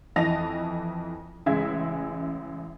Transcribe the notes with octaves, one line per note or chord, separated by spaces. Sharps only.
F2 E3 D#5 A5 A#6 F7
A1 C#3 G#3 E5 G#6